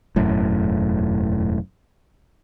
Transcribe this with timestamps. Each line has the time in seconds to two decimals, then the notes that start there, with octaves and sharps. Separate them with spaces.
0.16 E1 F#2 A2